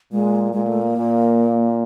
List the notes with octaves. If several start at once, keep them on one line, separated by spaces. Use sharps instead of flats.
A#2 G#3
A#2 G#3
A3
A#3
A#2